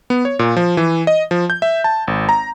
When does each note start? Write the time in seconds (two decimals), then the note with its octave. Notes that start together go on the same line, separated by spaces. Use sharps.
0.10 B3
0.25 C#5
0.39 A#2
0.56 F3
0.77 E3
1.07 D#5
1.31 F3
1.50 G6
1.62 E5
1.84 A5
2.07 G#1
2.29 A#5